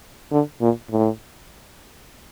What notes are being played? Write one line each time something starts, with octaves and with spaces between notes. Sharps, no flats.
D3
A#2
A2